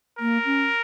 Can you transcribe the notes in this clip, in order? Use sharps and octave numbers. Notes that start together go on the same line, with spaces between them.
A#3 A#4
C#4